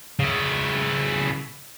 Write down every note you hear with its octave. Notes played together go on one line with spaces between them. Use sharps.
C#3 E4